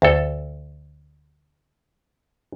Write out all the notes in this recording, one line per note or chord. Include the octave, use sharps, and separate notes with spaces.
D2 A4